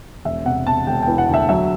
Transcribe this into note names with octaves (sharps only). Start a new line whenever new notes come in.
E1 E5
C3 F#5
C3 A5
E1 G5
G5
E3
F#5
D2 E5
F#3 E5